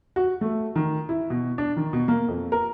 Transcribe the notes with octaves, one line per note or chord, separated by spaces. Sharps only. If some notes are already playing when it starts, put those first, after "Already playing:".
F#4
A3
D#3
E4
B2
D4
D#3
B2
A#3
F2
A#4